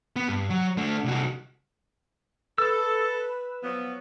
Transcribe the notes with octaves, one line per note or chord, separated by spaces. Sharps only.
B3
G2
F#3
A3 D4
C2 F#4
A4 B4 E6
F3 F#3 B3